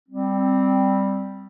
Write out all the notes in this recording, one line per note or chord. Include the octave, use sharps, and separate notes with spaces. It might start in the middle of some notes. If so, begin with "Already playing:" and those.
G3 C4